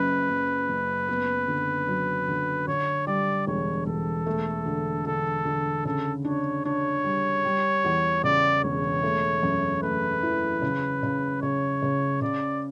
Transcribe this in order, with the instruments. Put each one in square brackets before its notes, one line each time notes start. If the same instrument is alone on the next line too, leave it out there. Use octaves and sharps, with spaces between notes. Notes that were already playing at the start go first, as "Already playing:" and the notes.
Already playing: [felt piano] F#1 F#2 [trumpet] B4
[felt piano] F#1
F#1
B3
D3
F#3
D3
[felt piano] D3 [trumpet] C#5
[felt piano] G3 [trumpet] D5
[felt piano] E1 [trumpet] C#5
[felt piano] E1 [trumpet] A4
[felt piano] A3
D3
[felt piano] D3 [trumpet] A4
[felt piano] D3
[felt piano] C#3 [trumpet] A4
[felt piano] D4 [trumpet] C#5
[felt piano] D4 [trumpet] C#5
[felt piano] G3
G3
E2
[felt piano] C#3 [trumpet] D5
[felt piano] E1 [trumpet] C#5
[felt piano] A3
F#2
[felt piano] A3 [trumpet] B4
[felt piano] E3
C#3
C#3
[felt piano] C#3 [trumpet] C#5
[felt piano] C#3
[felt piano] C#3 [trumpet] D5